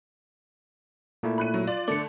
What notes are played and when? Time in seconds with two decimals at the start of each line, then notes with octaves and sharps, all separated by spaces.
1.23 A#2 A3 E4
1.38 B5 F#6 D#7
1.54 F#3
1.67 F4 D5
1.88 D3 A3 D5 C#7